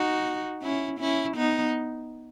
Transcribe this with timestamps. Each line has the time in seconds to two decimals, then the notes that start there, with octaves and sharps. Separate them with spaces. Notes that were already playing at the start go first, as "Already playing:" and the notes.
Already playing: D#4 F#4
0.63 C#4 E4
1.00 C#4 E4
1.37 B3 D#4